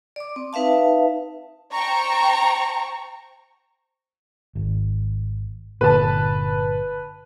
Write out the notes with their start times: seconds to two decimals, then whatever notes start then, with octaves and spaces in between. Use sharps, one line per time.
0.16 D5 D6
0.36 C4
0.53 D#4 B4 E5 F5 A5
1.72 C5 G5 A5 A#5 C#6
4.55 G#1
5.81 G1 A#2 D3 B4 A5